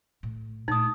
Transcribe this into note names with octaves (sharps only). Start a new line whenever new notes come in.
A2
A#2 A3 D#4 D#6